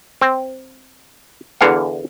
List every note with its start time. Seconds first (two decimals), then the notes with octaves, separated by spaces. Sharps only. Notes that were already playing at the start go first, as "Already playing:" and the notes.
0.21 C4
1.61 E2 D3 E3 F5 F#5